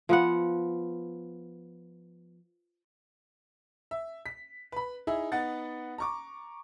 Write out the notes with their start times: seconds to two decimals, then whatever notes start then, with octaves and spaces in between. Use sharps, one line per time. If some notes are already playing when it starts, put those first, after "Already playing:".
0.09 F3 B3 F#5
3.91 E5
4.26 B6
4.72 B4 B5
5.07 D#4 E4 G#4 E5
5.32 B3 D#4 F#5 A6
5.98 A#5 C#6 D6